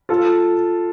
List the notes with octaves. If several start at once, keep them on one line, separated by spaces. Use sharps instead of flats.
F4 A4